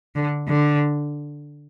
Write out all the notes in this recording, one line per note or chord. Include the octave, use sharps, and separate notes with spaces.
D3
D3